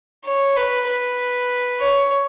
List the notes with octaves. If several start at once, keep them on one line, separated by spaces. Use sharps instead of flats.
C#5
B4
B4
C#5